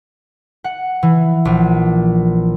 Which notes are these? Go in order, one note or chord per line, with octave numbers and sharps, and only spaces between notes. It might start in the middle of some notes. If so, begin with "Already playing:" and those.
F#5
E3
A#1